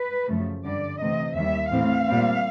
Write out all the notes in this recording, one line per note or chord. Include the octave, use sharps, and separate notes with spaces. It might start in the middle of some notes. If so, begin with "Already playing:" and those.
Already playing: B4
F#2 C#3 F3 A3
G2 D3 G3 D5
C3 E3 A3 C4 D#5
D#2 D#3 G3 E5
A2 E3 A3 C4 F5
A#2 G3 C4